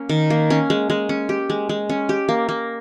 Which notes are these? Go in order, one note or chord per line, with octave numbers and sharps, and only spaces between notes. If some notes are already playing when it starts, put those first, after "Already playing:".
Already playing: A#3 C#4
D#3
A#3
C#4
G#3
G#3
C#4
G4
G#3
G#3
C#4
G4
A#3
A#3